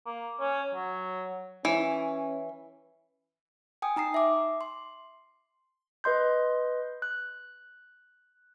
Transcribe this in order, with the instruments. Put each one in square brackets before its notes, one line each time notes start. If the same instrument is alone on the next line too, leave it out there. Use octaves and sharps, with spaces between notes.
[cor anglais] A#3
C#4
F#3
[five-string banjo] E3 [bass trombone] C#4
[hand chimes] G5 G#5 D#6
D#4 A#5 D#6 C7
E5 D6
C6
[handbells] B4 D#5 C6 G6
F#6